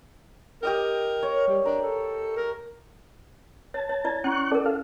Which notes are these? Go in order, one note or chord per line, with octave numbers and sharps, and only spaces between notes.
G4 A#4 D#5 G5
C#5
G3
D4 A#4
A4
A#4
C#5 A5
C#5
E4 D5
C#4 E4 C#6 F#6
C#4 A4 A#4 D5
A4 F5